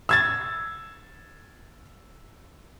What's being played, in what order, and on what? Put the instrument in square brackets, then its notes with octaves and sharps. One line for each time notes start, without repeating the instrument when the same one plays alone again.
[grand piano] E6 G#6 A6